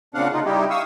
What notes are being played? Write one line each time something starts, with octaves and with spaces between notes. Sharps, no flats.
A#2 C#3 C4 D4 F5 F#5
C#3 D#4 F4
G3 D#4 E4 G4
F5 C#6 D#6 E6